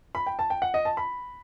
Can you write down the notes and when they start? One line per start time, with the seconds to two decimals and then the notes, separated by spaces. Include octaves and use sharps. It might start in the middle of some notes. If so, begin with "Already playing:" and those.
0.15 B5
0.27 G5
0.39 A5
0.50 G5
0.62 F#5
0.74 D#5
0.85 A5
0.97 B5